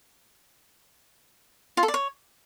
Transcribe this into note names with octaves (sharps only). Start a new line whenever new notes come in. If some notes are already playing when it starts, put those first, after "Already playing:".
F4
A4
D5
C#5